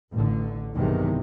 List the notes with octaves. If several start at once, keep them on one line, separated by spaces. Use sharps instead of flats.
A1 D3
B1 E2 G2 C3 D#3 G#3